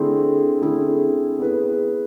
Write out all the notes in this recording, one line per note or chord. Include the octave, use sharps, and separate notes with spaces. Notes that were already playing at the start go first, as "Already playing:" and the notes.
Already playing: D3 A3 C4 E4 G#4
D3 A3 C4 E4 G#4
B3 E4 G#4 B4